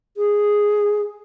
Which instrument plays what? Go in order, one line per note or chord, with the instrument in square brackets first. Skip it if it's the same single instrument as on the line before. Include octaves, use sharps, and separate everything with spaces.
[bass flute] G#4